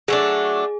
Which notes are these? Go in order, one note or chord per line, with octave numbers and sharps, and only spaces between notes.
F#3 A3 D4 G#4